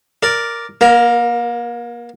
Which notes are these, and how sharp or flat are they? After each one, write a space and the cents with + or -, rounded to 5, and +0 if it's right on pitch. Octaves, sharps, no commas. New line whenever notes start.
A#4 +0 D5 +0
A#3 +35 A#4 +0